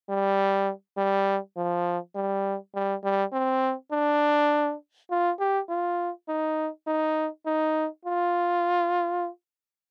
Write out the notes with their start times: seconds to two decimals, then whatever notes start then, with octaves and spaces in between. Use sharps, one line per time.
0.09 G3
0.97 G3
1.57 F3
2.15 G3
2.75 G3
3.04 G3
3.33 C4
3.92 D4
5.11 F4
5.39 G4
5.69 F4
6.28 D#4
6.87 D#4
7.46 D#4
8.05 F4